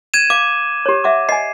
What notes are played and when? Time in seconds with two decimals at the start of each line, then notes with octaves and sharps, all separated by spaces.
0.14 G#6 D#7 E7
0.30 F5 D6
0.86 G4 C#5
1.04 E5 F#5 D6
1.29 D#5 G#5 C7